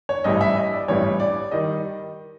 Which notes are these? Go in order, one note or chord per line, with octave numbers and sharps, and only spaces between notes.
C#5
A1 G2 E3 G3 D#5
E5
D#5
D5
A1 G2 E3 G3 C#5
D5
D#3 G3 D#5